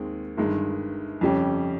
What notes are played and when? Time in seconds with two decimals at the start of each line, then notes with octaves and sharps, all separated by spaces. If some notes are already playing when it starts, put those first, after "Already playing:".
Already playing: D#2 D#3 G#3 C4
0.37 G1 G2 D#3 G#3
1.21 F2 C#3 G3 C#4 G4